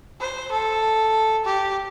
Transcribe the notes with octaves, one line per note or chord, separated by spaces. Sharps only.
C5
A4
G4